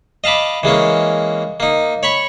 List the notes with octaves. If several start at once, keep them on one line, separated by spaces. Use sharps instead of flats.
D#5 F5 A5 B5 D6
E3 G#3 A#3 C#4
A#3 D#4
C#5 B5 C#6